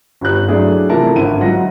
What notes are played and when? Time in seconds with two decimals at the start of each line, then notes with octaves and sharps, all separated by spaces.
0.21 G1 G4 F#6
0.48 F#3 A3 D4 E4 G#4
0.89 C3 E3 F3 A3 A#4 A5
1.16 G#1 D3 E4 D#7
1.41 G#2 F#3 F4 F#5 A#6